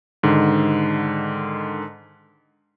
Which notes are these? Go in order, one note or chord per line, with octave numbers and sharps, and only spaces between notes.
G#2 D3 D#3